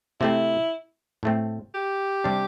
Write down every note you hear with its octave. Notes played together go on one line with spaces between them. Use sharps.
C3 A3 C4 E4
A2 A3 C4
G4
C3 G3 D4